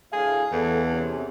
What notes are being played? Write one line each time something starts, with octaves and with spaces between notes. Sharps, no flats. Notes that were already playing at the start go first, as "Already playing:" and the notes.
D2 A2 G#4 F5
E2 A4
C3 C#4